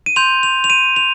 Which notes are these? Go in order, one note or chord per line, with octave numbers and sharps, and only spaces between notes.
D#7
C6 G6 F7
F7
F7
D#7
F7